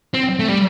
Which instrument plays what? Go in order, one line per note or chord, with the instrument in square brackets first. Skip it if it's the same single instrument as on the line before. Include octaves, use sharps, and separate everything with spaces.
[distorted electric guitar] C4
A3
G3